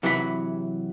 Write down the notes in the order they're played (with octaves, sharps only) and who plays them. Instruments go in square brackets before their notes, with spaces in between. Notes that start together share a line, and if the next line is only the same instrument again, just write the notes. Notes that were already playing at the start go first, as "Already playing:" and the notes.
[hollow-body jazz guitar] C3 E3 F#3 F#4 D#5 B5